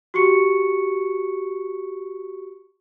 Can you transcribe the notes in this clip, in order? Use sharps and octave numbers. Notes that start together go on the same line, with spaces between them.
F#4 G4 C#6 C#7